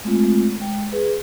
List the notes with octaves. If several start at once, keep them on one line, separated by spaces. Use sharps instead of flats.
G#3 A3 C4 F4
G#3 G5
G#4 B4